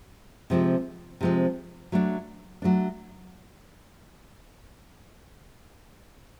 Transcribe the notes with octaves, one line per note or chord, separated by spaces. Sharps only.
C3 F3 G#3 C4
C3 F3 G#3 C4
F#3 A3 D4
F#3 A3 D4